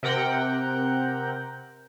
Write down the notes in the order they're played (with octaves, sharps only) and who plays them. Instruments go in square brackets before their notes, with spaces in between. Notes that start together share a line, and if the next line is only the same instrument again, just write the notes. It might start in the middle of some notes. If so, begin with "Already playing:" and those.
[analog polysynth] C3 A#4 F#5 G5